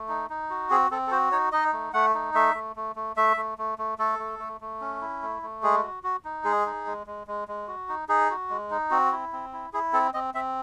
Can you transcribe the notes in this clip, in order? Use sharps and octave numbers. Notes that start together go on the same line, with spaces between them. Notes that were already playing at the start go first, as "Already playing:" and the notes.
Already playing: A3
D#4
D#4
F#4
C4 G#4
C4 A4
A4
F#4 C5
D#4 C#5
D#4 D#5
A3
A3 F#5
D#4
A3 E5
A3
A3
A3
A3 E5
A3
A3
A3
A3 A4
A3
A3
A3
C#4
E4
A3
A3
G#3 G#4
F#4
F#4
D#4
G#3 G#4
D#4
G#3
G#3
G#3
G#3
F#4
D#4
D#4 G#4
F#4
G#3
D#4
C4 F#4
E4
C4
E4
E4 G#4
C4 A4
C4 D#5
C4 E5